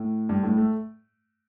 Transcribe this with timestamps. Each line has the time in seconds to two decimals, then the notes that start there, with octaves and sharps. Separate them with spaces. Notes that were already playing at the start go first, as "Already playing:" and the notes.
Already playing: A2
0.29 G2
0.43 A2
0.57 A3